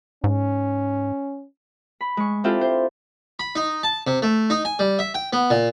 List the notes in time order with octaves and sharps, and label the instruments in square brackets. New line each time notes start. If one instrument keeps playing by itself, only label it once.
[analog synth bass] G#2 [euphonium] C#4
[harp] B5
G#3 C#6
C4 D4 E4 F4 G4 A4
C5
[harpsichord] B5
D#4
A5
C3
A3
D#4
G#5
G3
E5
G5
B3
A#2